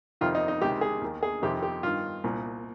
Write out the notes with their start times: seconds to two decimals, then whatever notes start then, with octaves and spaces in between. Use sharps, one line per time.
0.21 F2 C3 D#3 F4
0.35 D#4
0.48 D#4
0.61 C#2 C3 D#3 G4
0.81 G#4
1.01 D#2 D#3
1.23 G#4
1.42 F2 C3 D#3 G4
1.63 G4
1.83 G2 D#3 F4
2.24 C2 A#2